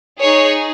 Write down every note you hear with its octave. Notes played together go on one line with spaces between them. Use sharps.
D#4 G#4 C#5